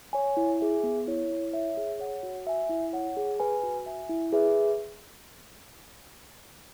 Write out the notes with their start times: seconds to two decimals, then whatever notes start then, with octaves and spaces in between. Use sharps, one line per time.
0.13 C#5 G#5
0.37 E4
0.60 G#4 E5 G#5
0.83 B3
1.07 E4 C#5
1.30 E4
1.53 C#5 E5
1.77 G#4
2.00 C#5 F#5
2.23 F#4
2.47 E5 G#5
2.69 E4
2.93 C#5 F#5
3.17 G#4
3.40 B4 G#5
3.63 F#4
3.86 E5 G#5
4.09 E4
4.32 G#4 B4 E5